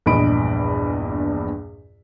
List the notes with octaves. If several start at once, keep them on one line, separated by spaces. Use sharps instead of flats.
A#1 E2 G2 D#5 B5 D7